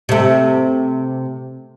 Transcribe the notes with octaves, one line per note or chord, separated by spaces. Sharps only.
C3 A3